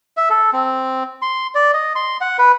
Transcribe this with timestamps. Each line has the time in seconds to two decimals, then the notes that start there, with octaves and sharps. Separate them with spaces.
0.17 E5
0.30 A4
0.53 C4
1.22 C6
1.55 D5
1.74 D#5
1.96 C6
2.21 F#5
2.39 B4